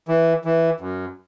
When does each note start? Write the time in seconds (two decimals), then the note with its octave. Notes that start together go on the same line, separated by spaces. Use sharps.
0.08 E3
0.45 E3
0.80 F#2